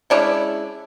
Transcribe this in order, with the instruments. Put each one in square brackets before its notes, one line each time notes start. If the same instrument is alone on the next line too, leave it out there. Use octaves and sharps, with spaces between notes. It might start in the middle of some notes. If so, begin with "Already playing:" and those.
[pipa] G#3 C#4 D4 E4